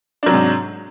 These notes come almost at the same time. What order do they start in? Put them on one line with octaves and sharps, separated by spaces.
D4 F#3 C3 G#2